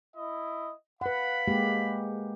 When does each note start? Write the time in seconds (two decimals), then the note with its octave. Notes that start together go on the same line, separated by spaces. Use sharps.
0.16 E4 D#5
1.01 B4 F5 F#5 B5
1.48 G#3 A#3 G4